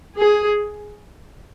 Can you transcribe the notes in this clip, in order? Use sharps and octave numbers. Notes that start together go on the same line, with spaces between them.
G#4